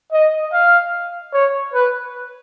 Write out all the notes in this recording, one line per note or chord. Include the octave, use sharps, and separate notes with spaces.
D#5
F5
C#5
B4